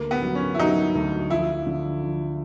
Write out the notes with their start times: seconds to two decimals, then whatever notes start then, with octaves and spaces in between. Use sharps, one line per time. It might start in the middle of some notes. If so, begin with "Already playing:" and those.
Already playing: D2 A#3
0.11 B3
0.22 F#3
0.35 C#4
0.54 E4
0.59 F#3 D#4
0.95 D2
1.30 F3 E4
1.67 D3
2.03 F3